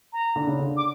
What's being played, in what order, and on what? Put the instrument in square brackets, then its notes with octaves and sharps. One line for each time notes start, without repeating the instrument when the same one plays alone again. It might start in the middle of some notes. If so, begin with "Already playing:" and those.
[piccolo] A#5
[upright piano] D3
C#3
D3
[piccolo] D6